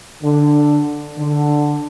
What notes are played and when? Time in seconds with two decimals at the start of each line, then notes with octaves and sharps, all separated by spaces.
0.23 D3
1.18 D3